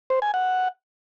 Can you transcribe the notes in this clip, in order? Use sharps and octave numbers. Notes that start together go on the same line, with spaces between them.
C5
G#5
F#5